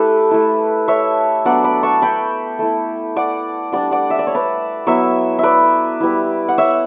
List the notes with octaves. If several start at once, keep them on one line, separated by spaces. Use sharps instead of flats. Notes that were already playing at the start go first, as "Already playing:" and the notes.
Already playing: A3 E4 G4 A4 B4
A3 E4
C#5 E5
F#3 B3 D4 D5 F#5
B5 D6
A5 C#6
G5 B5
A3 E4
D5 F#5
G3 D4 D5 F#5
D5 F#5
E5
D5
C#5
B4 D5
F#3 B3 E4 C#5 E5
B4 D5 E5
G3 B3 E4
F#5
C#5 E5